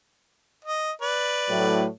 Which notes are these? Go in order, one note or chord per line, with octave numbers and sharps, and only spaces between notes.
D#5
B4 D5
A2 F#3